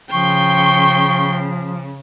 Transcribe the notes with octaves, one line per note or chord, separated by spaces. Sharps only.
C#3 F3 G5 C6 C#6